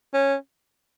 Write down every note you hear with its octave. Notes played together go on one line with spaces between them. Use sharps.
C#4